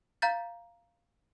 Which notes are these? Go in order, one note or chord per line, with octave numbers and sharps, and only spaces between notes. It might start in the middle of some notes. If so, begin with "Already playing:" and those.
F5 A#5 G6 A6